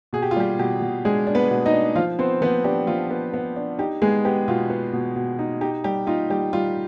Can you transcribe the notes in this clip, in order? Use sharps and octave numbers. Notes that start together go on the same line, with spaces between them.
B2 G#4
G4
F4
G3 G4
B2 G4
B2
G#3 D4 G#4
D4
B3 B4
B2
D#4 D#5
D4
F3 F4 F5
B3 C4 C5
F3 B3 B4
D4 G4
F3 F4
B3
B3
D4
D#4 G4
G#3 B3 G#4
B3 G4
B2 F4
B3
B2
B2
D#4
D#4 G4
G3 G4
D#4 F4
G3 G4
G3 F4